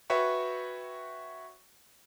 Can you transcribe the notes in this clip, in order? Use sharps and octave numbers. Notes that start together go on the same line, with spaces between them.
F#4 B4 C#5 E5 G5 C#6